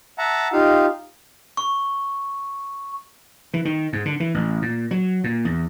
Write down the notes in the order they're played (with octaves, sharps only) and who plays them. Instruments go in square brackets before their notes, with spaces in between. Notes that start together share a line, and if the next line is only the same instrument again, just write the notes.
[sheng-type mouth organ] E5 F#5 A5 A#5
D#4 F4 G4 F5
[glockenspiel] C#6
[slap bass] E3
D#3
G#2
D3
E3
A1
A#2
F#3
A#2
E2